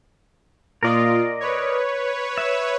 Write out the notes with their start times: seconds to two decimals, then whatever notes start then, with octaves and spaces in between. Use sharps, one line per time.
0.83 A#2 F4 A#4 D5 D#5
1.40 B4 C#5
2.38 E5